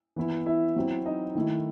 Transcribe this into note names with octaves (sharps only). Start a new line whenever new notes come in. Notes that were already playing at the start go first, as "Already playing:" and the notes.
E3 B3 E4
E4 E5
F#3 C4 E4
D#4 D#5
D#3 A3 E4